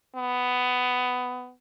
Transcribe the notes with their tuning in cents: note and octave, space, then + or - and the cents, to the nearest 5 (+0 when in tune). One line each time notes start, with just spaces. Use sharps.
B3 +15